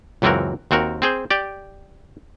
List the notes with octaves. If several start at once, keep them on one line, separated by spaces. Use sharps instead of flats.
C#2 F#2 E3 C4 F#4 A#4
D#2 C4 F#4 A#4
C4 G#4 C5
G4 D5